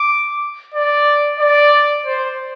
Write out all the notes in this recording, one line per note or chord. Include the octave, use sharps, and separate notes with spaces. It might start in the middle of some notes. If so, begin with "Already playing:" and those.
Already playing: D6
D5
D5
C5